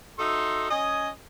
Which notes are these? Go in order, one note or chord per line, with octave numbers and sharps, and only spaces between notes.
D#4 F#4 A4 D#5 E5 C6
C#4 D#5 G#5